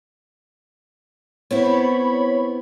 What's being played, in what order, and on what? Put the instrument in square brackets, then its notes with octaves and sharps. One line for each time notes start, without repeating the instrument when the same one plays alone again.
[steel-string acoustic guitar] B3 C4 E4 [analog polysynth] C#5 B5